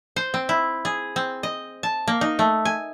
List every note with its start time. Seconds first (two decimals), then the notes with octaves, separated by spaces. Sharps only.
0.16 C5
0.34 C4
0.49 E4
0.85 G#4
1.16 C4
1.43 D#5
1.83 A5
2.08 A#3
2.21 D#4
2.39 A3
2.65 G#5